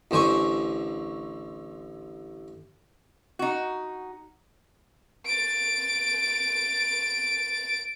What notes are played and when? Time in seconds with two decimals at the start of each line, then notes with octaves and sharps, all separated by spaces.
0.11 A1 D3 C5 G#5 C#6
3.39 D#4 F#4
5.26 A6 D7